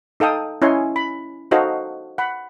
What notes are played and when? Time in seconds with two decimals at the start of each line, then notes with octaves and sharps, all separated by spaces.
0.20 D#4 A4 F5 G5 D#6
0.62 C#4 E4 C#5 D#5 G#5 C6
0.96 B5
1.51 D#4 F#4 A4 C5 D#5 F5
2.18 F#5 B5